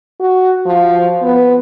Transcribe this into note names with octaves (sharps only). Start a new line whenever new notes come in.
F#4
F3
B3